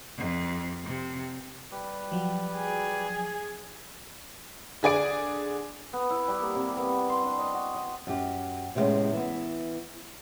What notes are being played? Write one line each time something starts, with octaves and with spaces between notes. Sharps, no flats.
F2
C3
G3 G4 B4
F3 F#3
G#4
D3 G#4 D5 D7
B3
E4
G3
A#3
C3
B3
G5
C6
D4
D#5
F#4
D#5
F#2 G4
A2 C3 G3 G#3 B3 C#4
E3 B3